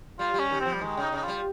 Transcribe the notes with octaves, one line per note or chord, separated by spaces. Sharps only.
G3 F4
G3
C#4
D#3
F3 C4
G3
D#3 G#3
C#3 D#4
C#3 D#4
G3 F4